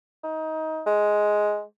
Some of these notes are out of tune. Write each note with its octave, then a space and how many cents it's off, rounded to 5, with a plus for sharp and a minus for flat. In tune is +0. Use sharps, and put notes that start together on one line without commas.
D#4 +25
G#3 +5